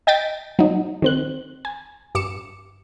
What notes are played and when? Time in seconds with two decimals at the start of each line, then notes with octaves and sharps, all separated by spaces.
0.07 D#5 G5 G6 A6 B6 D7
0.59 F#3 D#4
1.02 D#3 C4 F#6
1.65 G#5
2.15 G2 D6 C#7 E7